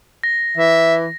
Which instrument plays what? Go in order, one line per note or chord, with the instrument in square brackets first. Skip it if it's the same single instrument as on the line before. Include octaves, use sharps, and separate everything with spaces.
[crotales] A#6
[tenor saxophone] E3 [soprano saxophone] E5